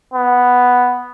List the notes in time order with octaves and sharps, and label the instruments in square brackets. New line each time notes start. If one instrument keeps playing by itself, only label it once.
[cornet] B3